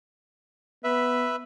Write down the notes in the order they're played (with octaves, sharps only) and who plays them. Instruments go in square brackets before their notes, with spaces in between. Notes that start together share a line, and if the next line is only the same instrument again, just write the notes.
[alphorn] B3 [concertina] B4 E5